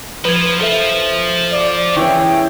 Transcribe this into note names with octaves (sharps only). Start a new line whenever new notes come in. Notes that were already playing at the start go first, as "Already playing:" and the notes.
F3 B4 G#6
F3 A4 E5
D5
E3 C#4 G#4 E5 G5 C#6